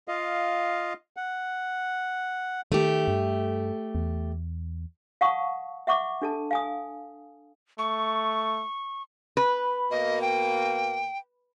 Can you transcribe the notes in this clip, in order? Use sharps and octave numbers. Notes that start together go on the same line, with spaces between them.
F4 D#5 F5
F#5
D#3 A3 G4
G2
E2
F5 F#5 A5 C#6 D#6
E5 F#5 C#6 D6
D4 A4 A5
F5 G#5 D#6
A3 C#6
B4
B2 A#3 D#5
G5